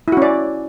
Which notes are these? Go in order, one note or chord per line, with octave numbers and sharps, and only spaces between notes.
C#4 E4 F#4 D5